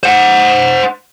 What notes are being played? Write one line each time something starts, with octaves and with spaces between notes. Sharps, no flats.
C5 F#5